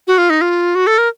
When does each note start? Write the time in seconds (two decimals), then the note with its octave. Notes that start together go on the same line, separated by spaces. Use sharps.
0.07 F#4
0.18 F4
0.30 D#4
0.41 F4
0.75 F#4
0.87 A4
0.98 A#4